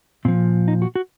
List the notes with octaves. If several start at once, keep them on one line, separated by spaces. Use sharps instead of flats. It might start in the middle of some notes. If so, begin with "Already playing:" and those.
A#2 F3 C4
D#4
F#4
F#4